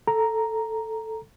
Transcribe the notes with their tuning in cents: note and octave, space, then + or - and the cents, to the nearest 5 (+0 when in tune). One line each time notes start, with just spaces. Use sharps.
A4 +0 A#5 +0